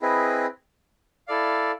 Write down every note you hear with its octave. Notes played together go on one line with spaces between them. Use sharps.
C4 E4 G#4 B4 D#5
E4 A4 D5 F5